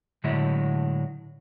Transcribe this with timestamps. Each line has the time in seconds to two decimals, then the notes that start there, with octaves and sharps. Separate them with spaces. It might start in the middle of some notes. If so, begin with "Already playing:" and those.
0.24 A2 D3 F#3 G#3 E4 E5